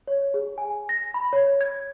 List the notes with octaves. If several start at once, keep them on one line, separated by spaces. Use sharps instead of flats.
C#5
G#4
G#5
A#6
B5
C#5
G#6